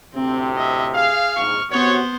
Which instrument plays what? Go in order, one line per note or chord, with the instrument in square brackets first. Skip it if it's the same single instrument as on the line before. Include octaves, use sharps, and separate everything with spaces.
[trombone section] D2 A2 C3 [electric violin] C4
[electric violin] D#5 E5
[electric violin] G#4 [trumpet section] F5
[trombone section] A#1 G#2 [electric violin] C#6 F6
[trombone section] C3 F#4 [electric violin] B3 C5 [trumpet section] C#5